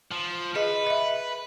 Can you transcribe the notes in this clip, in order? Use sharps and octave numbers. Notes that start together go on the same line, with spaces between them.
F3
G#4 B4 D#5
D#5 E5